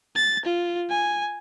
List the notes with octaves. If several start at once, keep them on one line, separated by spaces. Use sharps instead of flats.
A6
F4
G#5